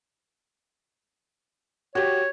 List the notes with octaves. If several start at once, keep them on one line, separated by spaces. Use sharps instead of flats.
F#4 G4 C#5